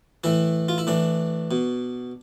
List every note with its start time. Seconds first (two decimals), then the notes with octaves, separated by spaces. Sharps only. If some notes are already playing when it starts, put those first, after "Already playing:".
0.24 A2 E3 E4
0.69 F4
0.78 E4
0.87 A2 E3 D4
1.51 B2